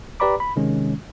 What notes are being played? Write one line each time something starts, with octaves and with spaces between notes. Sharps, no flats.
G4 B4 D5 A#5 B5 D6
B5
C3 D#3 G#3 C#4